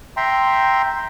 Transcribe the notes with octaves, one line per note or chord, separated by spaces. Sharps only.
E5 G5 A#5 C6